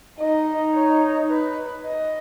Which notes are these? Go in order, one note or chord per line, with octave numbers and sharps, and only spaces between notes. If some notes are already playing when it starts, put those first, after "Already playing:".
D#4 D#5
C#5
B4
D#5